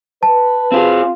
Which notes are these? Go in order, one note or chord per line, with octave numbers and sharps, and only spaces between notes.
B4 A5
C4 F4 G4 G#4